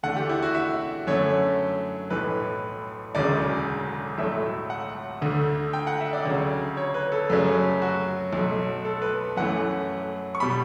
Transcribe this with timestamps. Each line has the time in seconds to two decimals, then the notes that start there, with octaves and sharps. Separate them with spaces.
0.03 E2 D3 A3 F#5
0.16 G4
0.29 E4
0.42 F#4
0.55 E5
1.07 F#2 D3 A3 C#5
2.10 B1 A2 E3 B4
3.15 E1 D2 C#3 F#3 D5
4.18 B1 A2 F#3 A3 E5
4.70 F#5
5.21 D2 D3 A3
5.73 G5
5.87 F#5
6.00 E5
6.13 D5
6.25 D2 C#3 F#3
6.77 C#5
6.94 B4
7.12 A4
7.30 F#2 C#3 F#3 A3
7.82 F#4
8.33 B1 B2 A3
8.85 A4
9.02 B4
9.37 F#2 E3 A3 F#5
10.35 C#6
10.40 B2 G3 B5